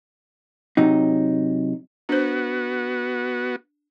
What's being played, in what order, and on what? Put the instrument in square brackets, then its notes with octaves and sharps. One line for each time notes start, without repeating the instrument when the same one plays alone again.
[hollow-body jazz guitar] C3 F#3 D#4
[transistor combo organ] B3 F#4 [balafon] D4 C5